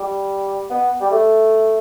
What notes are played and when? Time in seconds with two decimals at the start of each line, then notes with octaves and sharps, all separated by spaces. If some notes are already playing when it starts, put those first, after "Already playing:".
Already playing: G3
0.71 B3
1.01 G3
1.11 A3